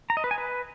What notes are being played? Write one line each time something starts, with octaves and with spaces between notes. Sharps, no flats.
A#5
D#5
B4
G#5
B4